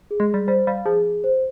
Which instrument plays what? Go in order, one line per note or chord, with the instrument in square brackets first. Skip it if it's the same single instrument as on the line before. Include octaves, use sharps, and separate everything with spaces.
[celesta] G#4
[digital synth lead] G#3
[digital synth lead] G3 [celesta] G#4
[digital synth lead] G3 [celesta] C5
[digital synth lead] G3 [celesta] F5
[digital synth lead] F3 [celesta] G#4
[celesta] G#4
C5